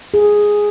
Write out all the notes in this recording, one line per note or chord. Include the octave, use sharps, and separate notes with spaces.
G#4